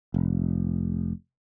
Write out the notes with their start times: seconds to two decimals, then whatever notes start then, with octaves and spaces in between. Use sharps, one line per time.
0.14 F1